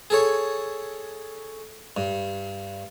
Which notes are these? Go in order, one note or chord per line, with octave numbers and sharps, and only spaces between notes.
G#4 A4 C#5
G2